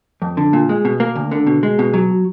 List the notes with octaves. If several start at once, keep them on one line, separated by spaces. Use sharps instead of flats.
F2
D3
A#2
G#3
B2
A#3
D2
D3
B2
G#3
B2
F#3